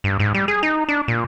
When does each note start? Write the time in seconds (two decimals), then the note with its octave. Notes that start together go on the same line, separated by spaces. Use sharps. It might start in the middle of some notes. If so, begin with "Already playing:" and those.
0.04 G2
0.20 G#2
0.34 G3
0.48 G#4
0.63 D#4
0.88 D4
1.08 A#2